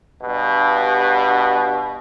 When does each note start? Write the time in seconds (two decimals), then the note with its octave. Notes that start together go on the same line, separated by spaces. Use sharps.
0.23 G2 B2